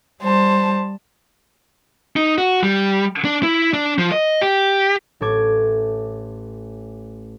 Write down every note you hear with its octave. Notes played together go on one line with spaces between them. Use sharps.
G3 C5 A5
D#4
F#4
G3
D4
E4
D4
F3
D#5
G4
A1 A3 A4 D6 G#6